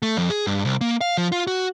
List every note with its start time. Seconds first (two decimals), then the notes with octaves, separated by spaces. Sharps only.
0.02 A3
0.17 F2
0.30 G#4
0.47 G2
0.65 C2
0.81 A#3
1.01 F5
1.17 F3
1.32 F4
1.47 F#4